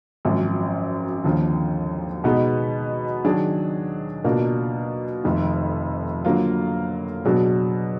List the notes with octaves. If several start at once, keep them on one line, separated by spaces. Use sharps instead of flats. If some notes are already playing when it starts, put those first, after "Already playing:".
G#1 F#2 F3
D#2 D3 F3
B2 G#3 B3 D#4
D#3 F#3 D4 G#4
B2 A#3 D4 F4 A#4
F1 F2 D#3
D3 F#3 A#3 F4
B2 F#3 D4 G#4